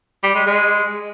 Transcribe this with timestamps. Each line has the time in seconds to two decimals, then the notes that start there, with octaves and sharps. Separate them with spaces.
0.23 G3
0.35 G#3
0.47 G#3